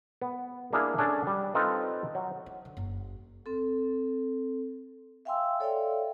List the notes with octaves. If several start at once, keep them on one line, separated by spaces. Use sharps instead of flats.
B3
A#3 D4 E4 G#4 F5
C#4 D4 G#4 A4
G3
C4 D#4 F4 A4 B4
F#3
E4
D3
F#1
C4 A4
E5 F5 G5 G#5 C6 E6
A4 C#5 D5 E5 F5 G5